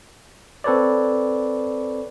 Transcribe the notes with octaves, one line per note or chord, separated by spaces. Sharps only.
C4 A4 B4 C#5 D5